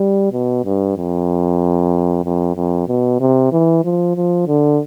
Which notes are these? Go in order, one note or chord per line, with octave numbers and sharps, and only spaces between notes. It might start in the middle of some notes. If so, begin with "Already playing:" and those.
Already playing: G3
B2
G2
F2
F2
F2
B2
C3
E3
F3
F3
D3